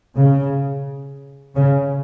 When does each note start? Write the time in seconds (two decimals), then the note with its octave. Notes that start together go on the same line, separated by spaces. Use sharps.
0.16 C#3
1.56 C#3